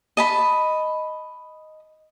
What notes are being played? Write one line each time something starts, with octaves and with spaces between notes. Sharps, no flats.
D#5 A5 B5